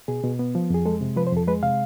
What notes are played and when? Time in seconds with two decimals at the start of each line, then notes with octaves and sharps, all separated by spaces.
0.08 B2 G#4
0.24 B2
0.39 B3
0.55 F3
0.70 F2 G#4
0.86 G#3 A4
1.01 C3
1.16 F3 B4
1.27 C5
1.32 F2 A4
1.47 G#3 B4
1.63 C3 F5